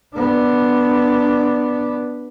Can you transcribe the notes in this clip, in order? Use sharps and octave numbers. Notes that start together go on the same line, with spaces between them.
B3 D4